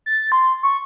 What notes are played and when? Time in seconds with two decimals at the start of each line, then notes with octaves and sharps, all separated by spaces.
0.06 A6
0.32 C6
0.63 C#6